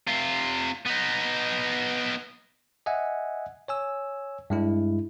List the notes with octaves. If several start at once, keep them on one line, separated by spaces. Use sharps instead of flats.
C3 F4
B3 D#4
D#5 E5 F#5 G#5
C#5 G#5 E6
G2 G#3 E4